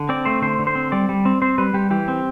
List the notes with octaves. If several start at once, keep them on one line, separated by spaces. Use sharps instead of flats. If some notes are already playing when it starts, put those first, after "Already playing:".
Already playing: D3
C4 D5
A3 C5
D3 C5
D3
C5
C4
G3 D5
G3
C4
C4 C5
G3 B4
G3 G4
E3 G4
C4